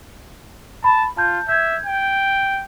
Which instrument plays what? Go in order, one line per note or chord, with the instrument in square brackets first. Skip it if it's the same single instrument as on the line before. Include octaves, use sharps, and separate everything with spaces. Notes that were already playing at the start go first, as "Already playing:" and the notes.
[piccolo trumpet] A5 [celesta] B5
[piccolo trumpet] F4 [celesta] A5 G6
[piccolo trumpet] E5 [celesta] G6 G#6
[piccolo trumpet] G5